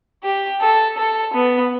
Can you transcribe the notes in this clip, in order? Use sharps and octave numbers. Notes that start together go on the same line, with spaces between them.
G4
A4
A4
B3